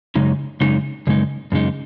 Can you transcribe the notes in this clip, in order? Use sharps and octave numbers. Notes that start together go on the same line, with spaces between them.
F#2 C#3 G#3 D#4
F#2 C#3 G#3 D#4
F#2 C#3 G#3 D#4
F#2 C#3 G#3 D#4